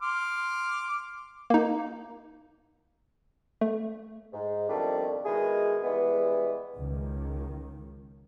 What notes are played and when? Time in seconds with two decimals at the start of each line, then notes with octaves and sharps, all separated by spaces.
0.02 C6 D6 F6
1.50 A#3 D#4
3.61 A3
4.33 G#2
4.68 F2 B2 D#3 G3 A3 D4
5.25 B2 D#3 G#3 E4 G#4
5.83 E3 G3 G#3 B3
6.77 C#2 D#3